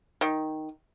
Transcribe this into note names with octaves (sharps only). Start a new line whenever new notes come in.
D#3